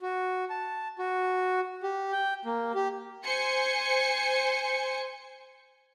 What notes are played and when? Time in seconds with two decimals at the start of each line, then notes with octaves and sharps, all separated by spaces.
0.01 F#4
0.50 A5
0.99 F#4
1.83 G4
2.12 G5
2.45 A#3
2.75 G4
3.24 C5 G#5 C#7